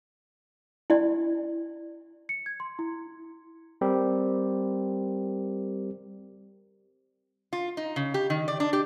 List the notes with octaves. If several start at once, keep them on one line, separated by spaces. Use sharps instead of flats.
E4 D5
C#7
G#6
C6
E4
G3 C4 G4 A#4
F4
D#4
C#3
G4
D#3
D5
D4
G4